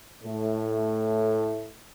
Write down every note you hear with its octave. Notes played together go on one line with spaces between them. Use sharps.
A2 A3